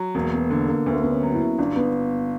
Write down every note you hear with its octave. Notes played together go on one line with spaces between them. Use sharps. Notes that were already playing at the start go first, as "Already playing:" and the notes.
Already playing: F#3
E1 A#3
B3
D3 A#3
A#3
D2 B3
A#3
B3
C#4
F#3
E4
G1 D4
B3